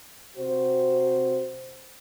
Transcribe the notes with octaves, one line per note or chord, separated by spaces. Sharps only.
C3 F#4 C5